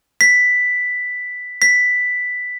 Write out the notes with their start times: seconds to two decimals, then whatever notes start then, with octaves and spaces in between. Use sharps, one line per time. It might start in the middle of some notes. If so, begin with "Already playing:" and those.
0.21 B6
1.62 B6